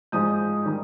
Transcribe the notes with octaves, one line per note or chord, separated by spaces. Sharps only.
G#2 F3 G#3 D#6 G6
D#3 G3